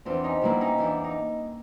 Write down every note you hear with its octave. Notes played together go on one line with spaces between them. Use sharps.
E2 C4 D4
C#4 D#4
B2 G3 A#3 D4 E4
C#4 D#4
E2 D4 E4
D#4